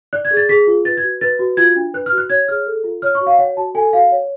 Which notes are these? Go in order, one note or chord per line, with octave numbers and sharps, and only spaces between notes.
D5 F#6
G#6
G#4
A6
G#4 B6
F4
B4 A6
G#6
F#4
B4 A6
F#4
F4 G#6
D4
B4 F#6
F6
F#4
F#6
C#5 G#6
G#4 F6
A4
F4
C#5 F6
C#6
F#4
F5
C#5 F#5
F#4 A5
A4 G#5
F#4 F5
C#5